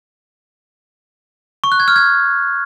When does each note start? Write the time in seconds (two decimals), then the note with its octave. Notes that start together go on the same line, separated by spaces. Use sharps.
1.64 C#6
1.72 F#6
1.80 G#6
1.88 F6
1.96 G#6